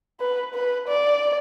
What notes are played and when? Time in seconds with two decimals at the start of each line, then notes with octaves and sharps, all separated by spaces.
0.20 B4
0.54 B4
0.88 D5